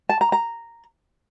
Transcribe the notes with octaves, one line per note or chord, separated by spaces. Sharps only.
A5
A#5
A#5